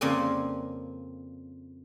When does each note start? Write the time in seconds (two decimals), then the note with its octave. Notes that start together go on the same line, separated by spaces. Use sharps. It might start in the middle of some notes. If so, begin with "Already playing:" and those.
0.01 F2 C#3 A#3 C4 D5 G#5